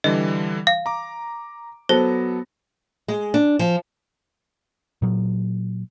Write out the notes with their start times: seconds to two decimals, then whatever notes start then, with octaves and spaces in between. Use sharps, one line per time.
0.04 D3 E3 G3 D#5
0.67 F5
0.86 A#5 D6
1.89 F#3 B3 A4 C5 A#6
3.08 G#3
3.34 D4
3.59 F3
5.02 A#2 F#3